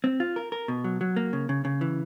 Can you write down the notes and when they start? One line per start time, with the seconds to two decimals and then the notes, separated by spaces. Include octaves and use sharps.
0.04 C4
0.20 F4
0.36 A#4
0.52 A#4
0.68 B2
0.84 F#3
1.01 F#3
1.16 A#3
1.33 C#3
1.49 C#3
1.65 C#3
1.81 E3